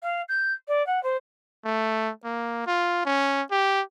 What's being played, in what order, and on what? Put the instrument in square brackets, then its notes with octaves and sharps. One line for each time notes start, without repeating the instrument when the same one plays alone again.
[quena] F5
G6
D5
F#5
C5
[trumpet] A3
A#3
F4
C#4
G4